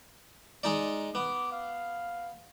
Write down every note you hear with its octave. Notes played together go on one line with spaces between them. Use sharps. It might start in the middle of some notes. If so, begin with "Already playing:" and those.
G#3 D#4 D5
B3 D6
F5